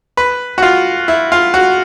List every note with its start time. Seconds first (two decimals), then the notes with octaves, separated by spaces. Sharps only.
0.17 B4
0.58 F#4
0.62 F4
1.08 E4
1.32 F4
1.54 F#4